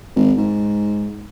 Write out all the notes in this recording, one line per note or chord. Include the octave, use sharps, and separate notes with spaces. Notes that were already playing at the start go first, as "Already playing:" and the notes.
G#1
G#2